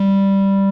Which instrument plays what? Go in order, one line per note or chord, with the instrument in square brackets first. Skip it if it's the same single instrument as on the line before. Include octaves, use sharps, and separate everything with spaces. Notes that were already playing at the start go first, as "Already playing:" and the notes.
Already playing: [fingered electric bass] G3